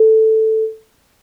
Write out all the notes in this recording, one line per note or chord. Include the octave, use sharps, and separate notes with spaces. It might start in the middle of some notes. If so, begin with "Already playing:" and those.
Already playing: A4